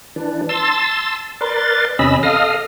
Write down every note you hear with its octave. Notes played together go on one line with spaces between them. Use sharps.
E3 D4
A5 C6 E6 A6
A#4 B4 D5 C6 A6
E2 C3 C#4 D#5 B5 E6
A4 D#5 F5 D#6 F6